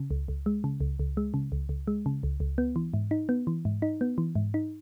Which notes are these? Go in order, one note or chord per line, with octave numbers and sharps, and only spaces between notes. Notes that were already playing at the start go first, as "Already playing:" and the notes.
Already playing: C#3
C#2
C#2
G#3
C#3
C#2
C#2
G#3
C#3
C#2
C#2
G#3
C#3
C#2
C#2
B3
E3
G#2
D#4
B3
E3
G#2
D#4
B3
E3
G#2
D#4